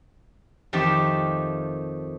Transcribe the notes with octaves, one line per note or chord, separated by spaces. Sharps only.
F2 D#3 A3 G4 A5